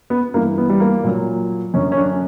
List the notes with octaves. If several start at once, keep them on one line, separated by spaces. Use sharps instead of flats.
B3
G2 E3 A#3
B3
G3
A#3
A#2 F#3
F#2 D3 F#3 C#4
C#4
D4